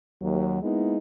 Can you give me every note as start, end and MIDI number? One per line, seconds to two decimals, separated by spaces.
0.22 0.60 39
0.22 0.60 54
0.62 0.97 56
0.62 0.97 58
0.62 0.97 59
0.62 0.97 63
0.62 0.97 64